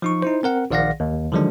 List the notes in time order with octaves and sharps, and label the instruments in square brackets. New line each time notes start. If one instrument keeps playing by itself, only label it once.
[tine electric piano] F3 D#4 C#6
D#4 E4 C5
C4 A#4 F#5
A#1 D#3 D5 F5 F#5 A#6
D#2
D3 D#3 F3 F#3 G#3 D4